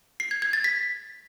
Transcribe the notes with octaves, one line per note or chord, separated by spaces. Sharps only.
C7
G#6
G#6
A6
B6